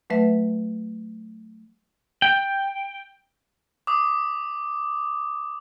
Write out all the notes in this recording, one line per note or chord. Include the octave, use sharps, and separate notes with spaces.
F#3 A3 B4 E5
G5
D6 D#6